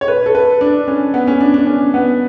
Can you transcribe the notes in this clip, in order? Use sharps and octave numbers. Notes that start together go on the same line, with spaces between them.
C#5
B4
A4
B4
D4
C#4
B3
C#4
D4
D4
C#4
B3